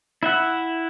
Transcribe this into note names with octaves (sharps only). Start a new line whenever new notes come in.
E4 E5 F#5